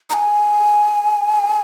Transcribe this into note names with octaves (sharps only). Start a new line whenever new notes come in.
A#5
G#5